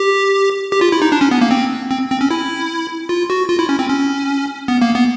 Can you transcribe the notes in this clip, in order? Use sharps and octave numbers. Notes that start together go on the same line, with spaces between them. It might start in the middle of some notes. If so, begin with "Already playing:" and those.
Already playing: G4
G4
F4
E4
D#4
D4
C#4
B3
A#3
C4
C4
C4
C#4
E4
F4
F#4
F4
E4
C#4
C4
C#4
B3
A#3
B3